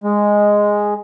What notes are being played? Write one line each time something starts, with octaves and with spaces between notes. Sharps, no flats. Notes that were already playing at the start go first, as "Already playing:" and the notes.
G#3